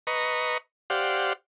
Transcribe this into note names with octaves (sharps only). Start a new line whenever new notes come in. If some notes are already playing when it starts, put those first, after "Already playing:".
B4 D#5 A#5 C#6
G4 C5 D5 F5 F#5